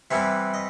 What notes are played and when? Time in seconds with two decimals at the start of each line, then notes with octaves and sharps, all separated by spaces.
0.11 C3 E3 G3 B3 E4 E5
0.54 D#5